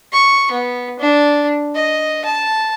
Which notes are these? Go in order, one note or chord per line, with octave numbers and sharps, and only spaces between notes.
C#6
B3
D4
D#5
A5